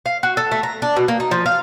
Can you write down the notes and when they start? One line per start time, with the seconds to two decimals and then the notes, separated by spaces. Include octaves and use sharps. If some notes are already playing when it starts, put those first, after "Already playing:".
0.06 F5
0.23 F#4
0.37 A4
0.52 A3
0.63 A#5
0.82 D4
0.96 B2
1.08 A#3
1.20 D#4
1.31 F3
1.46 F5